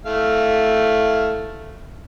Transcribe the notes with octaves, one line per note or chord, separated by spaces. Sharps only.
A3 E4 F5